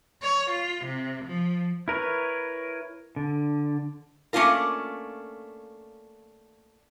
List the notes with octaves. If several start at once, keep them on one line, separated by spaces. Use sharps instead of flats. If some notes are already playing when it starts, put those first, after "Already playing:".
C#5
F4
C3
F3
E4 A#4 B4 C#5
D3
A3 A#3 C#4 D4 F4 A#4